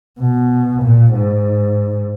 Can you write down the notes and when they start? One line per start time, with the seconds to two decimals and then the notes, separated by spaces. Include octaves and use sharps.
0.20 B2
0.82 A#2
1.14 G#2